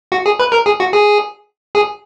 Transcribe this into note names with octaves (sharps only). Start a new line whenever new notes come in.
F#4
G#4
B4
A#4
G#4
F#4
G#4
G#4